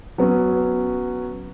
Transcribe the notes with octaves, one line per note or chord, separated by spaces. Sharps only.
F#3 B3 C#4